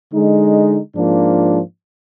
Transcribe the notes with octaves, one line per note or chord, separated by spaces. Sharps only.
D3 G#3 D#4
G#2 F3 A#3 D4 F4